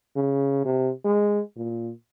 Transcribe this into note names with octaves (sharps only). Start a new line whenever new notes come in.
C#3
C3
G#3
A#2